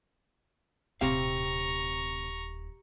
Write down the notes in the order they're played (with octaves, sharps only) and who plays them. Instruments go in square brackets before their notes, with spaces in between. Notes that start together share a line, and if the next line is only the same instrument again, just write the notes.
[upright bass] D#1 A2 [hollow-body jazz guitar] C3 C4 F5 [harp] G4 [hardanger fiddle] A#5 C#6